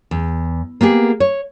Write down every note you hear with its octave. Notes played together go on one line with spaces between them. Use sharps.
E2
A#3 B3 G4 G#4
C#5